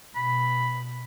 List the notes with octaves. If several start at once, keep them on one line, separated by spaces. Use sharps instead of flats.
B2 B5